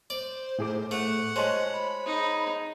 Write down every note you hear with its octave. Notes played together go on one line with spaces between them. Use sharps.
C5 D5
A2 G#4 D6
A3 F#5
G#3 C5 C#5 D#5 A5
B5
D#4 G#4